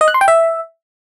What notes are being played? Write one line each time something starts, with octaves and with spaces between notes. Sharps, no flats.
D#5
F#6
C6
G5
E5